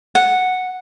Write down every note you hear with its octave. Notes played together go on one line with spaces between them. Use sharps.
F#5